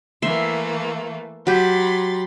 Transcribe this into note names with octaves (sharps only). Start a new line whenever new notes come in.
E3 A3 A#3 E5 C6
F#3 G4 B5 C6 A6